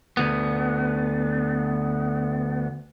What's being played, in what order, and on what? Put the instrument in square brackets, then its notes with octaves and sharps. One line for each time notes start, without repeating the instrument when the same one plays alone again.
[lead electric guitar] D2 B3